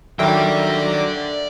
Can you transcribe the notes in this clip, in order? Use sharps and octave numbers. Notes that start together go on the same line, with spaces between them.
D3 D#3 F#3 A#3 D5 E5 G5 A#6